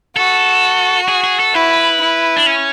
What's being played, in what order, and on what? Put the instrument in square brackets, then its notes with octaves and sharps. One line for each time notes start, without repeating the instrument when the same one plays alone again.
[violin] F#4 [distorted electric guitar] A4
[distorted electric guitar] G#4
G#4
A4
[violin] E4 [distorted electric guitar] B4
[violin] E4
[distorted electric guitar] D4
C#4